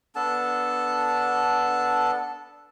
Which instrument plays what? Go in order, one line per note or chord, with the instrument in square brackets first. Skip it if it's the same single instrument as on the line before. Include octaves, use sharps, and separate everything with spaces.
[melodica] B3 D4 A4 A5